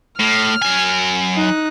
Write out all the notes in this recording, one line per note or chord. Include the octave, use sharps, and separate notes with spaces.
A2 F6
F#3 G#5
D#4 F#6